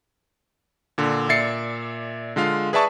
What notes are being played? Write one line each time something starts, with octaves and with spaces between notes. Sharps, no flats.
A#2 D3
A#2 D5 E5 A6 C7 C#7
D3 G#3 F4 F5
G#4 B4 D5 E5 A5 C#6